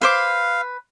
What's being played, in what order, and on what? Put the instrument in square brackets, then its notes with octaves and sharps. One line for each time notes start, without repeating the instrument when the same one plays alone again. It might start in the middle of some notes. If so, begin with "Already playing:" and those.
[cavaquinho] B4 C5 D6 [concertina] F5